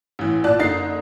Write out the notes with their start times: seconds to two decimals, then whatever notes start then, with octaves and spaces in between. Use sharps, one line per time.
0.19 A1 E3
0.44 A#1 F4 D5 A5 F#6
0.59 F#1 D3 D#4 A6 C7